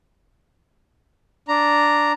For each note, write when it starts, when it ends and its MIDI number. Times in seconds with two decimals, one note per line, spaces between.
1.48 2.12 62
1.48 2.12 82